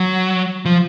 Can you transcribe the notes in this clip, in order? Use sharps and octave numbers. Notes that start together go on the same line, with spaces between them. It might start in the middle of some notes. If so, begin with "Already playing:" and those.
Already playing: F#3
F3